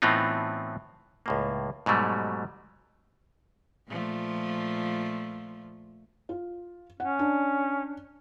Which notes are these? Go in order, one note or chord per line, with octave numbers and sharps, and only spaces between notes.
A2 E3 B3 C4 D#4 F4
C#2 A2 A#3
G#2 B2 F#3 G3 A3
A#2 F3 A3
F4
C#4 F#5
D4